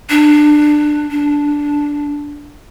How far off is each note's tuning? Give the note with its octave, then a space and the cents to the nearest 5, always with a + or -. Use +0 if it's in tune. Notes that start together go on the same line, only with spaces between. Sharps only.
D4 +20
D4 -5